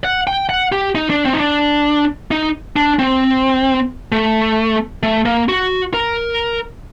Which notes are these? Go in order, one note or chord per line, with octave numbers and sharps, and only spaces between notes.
F#5
G5
F#5
G4
D#4
D4
C4
D#4
D4
D#4
D4
C4
A3
A3
A#3
F#4
A#4